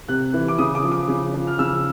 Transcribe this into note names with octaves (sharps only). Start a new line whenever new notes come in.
C3 F#6
E3
D6
C#3 D#6
D6
F3
D6
C#3
F3
F6
C#3 E6